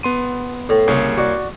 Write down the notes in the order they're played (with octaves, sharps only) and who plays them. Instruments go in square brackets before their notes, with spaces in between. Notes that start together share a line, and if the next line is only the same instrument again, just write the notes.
[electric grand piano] B3 C6 D#7
[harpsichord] A2
[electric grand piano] C2 A#3 C#5 [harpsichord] C#3
[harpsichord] F#4 D5